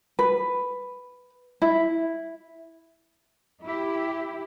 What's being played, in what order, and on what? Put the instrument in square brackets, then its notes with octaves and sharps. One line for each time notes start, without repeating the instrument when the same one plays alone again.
[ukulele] B4
E4
[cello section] E4 G4